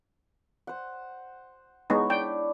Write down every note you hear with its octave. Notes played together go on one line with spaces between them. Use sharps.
C5 F#5
G#3 B3 D#4 E4 C#5
D4 G5